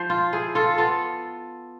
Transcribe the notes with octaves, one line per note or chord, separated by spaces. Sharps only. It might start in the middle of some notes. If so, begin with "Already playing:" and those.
Already playing: F3 C5
F4
E4 G#4
F4 A4
B3 F4 A4